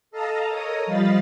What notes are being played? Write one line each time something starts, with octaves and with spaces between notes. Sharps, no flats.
A4 D#5 F5 A5 A#5
A4 A#4 C#5 D#5 A#5 D#6
F3 G3 D#5 F5 B5 A6